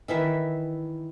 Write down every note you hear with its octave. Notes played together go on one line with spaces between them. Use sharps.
D#3 E3 E5